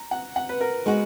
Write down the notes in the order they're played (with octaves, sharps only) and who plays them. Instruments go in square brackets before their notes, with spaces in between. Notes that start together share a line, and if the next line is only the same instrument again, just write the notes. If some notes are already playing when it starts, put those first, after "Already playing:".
Already playing: [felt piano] A#5
F#5
F#5
B4
A#4
[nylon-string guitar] G#3 B3 F#4